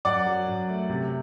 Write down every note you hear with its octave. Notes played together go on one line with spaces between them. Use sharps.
F#2 D5 F#5
F#3
F#2
A3
C3